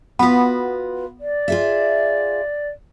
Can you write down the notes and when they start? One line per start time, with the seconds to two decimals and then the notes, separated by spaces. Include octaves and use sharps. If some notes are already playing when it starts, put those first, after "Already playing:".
0.19 B3 F4 F#4 B4
1.20 D5
1.48 F4 G#4 E5